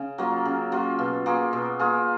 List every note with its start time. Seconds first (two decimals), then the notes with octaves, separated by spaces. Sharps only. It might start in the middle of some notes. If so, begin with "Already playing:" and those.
Already playing: C#3
0.18 F#3 A#3 F4
0.46 C#3
0.72 F#3 A#3 F4
0.99 B2
1.26 A#3 F4 G#4
1.53 B2
1.79 A#3 F4 G#4